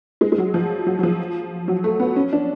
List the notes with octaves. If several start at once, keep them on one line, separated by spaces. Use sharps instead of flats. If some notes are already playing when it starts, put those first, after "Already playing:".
G#3
G#3
F#3
F3
F#3
F#3
F3
F#3
A3
B3
C#4
D4